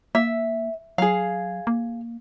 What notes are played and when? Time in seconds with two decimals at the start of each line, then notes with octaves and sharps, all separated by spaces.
0.15 A#3 E5
0.98 F#3 G#4 F5
1.67 A#3